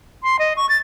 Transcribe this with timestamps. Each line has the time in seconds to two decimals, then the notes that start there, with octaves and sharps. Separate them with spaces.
0.23 C6
0.39 D#5
0.57 C#6
0.69 A6